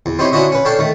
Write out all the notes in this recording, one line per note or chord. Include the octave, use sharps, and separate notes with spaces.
E2
C4 D#4 E4 G4 C#5
C#4 D4 E4 F#4 D#5 E5
C#4 B4
D4 A4 C#5 F5 G5
D#3 A3